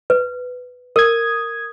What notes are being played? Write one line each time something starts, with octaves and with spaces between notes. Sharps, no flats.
B4
A#4 D#6 G#6